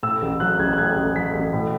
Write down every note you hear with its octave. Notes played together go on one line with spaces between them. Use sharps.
A2 E6
A1
F#3 F#6
A1 G#6
F#6
A2 G#6
A1
F#3 B6
A1
A2